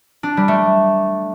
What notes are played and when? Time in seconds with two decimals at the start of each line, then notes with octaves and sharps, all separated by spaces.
0.23 D4
0.37 G3
0.48 A3